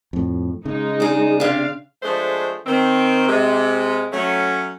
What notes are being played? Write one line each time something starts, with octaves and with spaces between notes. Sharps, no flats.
F2 A2
C#3 G#3 D#4
D4 G#4
C3 D4 F5
F3 G#3 A3 D4 G#4 C5
D#3 C4
C3 G#3
F#3 A3 C#4